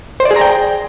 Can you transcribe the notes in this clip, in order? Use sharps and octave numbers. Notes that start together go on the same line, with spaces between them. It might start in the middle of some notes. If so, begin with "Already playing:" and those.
C5
D5
G#4
A#5
G5